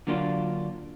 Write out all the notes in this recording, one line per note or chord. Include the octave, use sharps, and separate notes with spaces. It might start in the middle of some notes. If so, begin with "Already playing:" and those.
D3 F#3 A#3 D4 F4